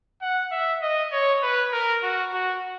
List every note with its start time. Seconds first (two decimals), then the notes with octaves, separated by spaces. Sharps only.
0.22 F#5
0.52 E5
0.82 D#5
1.13 C#5
1.42 B4
1.73 A#4
2.03 F#4
2.33 F#4